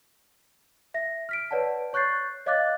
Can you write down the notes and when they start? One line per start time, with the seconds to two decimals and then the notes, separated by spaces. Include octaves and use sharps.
0.94 E5 A#6
1.29 F6 B6 D7
1.51 B4 C#5 D5 F#5 A5
1.93 C#5 C#6 F#6 G6 A6 C7
2.46 C#5 D#5 F5 D6 F#6 A6